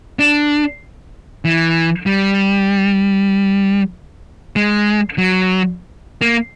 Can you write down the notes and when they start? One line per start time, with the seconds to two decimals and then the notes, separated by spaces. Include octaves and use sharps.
0.19 D4
1.45 E3
2.06 G3
4.56 G#3
5.18 F#3
6.21 A#3